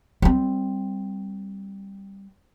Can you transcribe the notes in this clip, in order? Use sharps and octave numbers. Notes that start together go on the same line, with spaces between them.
G3 C4